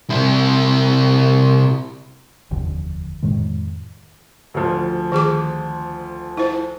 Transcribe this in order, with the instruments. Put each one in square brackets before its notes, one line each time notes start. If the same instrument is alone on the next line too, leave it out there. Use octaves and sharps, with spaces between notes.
[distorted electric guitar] C3 E4
[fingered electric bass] F1 D#2 D3 F3
F2 A2 D#3 G#3
[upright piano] D2 F3
[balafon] D#3 G#4 D6
E4 C5